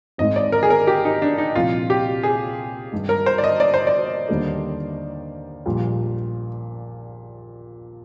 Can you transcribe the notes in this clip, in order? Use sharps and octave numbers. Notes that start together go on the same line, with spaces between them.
G#1 G#2 D#3 G#3 D#5
D5
A#4
G#4
A#4
G4
D#4
D4
D#4
C2 A#2 F3 F4
G4
G#4
G2 D#3 G#3
A#4
C5
D5
D#5
D5
C5
D5
D#2 D3 G3 A#3
A#1 A#2 G3